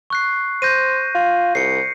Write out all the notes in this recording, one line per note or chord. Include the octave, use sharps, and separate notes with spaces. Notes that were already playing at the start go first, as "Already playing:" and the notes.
C#6 F#6 C7
C5 G6 A#6 D#7
F4
C2 C7 C#7